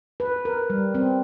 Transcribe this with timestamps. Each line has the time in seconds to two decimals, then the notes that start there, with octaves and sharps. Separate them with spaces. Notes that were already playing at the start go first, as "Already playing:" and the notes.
0.20 B4
0.45 A#4
0.70 G3
0.95 C4